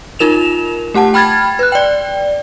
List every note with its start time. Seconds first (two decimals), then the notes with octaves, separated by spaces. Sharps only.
0.19 D#4 F4 A#4 E7 F7
0.94 A3 G4 F#5 A5
1.14 G5 B5 F6 G#6 A6
1.59 B4 F#6
1.72 D5 G5